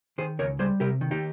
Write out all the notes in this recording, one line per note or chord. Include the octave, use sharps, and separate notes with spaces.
D#3 G#4 C5
C#2 A#4 C#5
G3 G#4 C5
C3 G4 A#4
D#3
D#4 G4